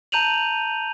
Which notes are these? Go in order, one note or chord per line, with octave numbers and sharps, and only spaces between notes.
A5 A#5 G6 D#7 F7 F#7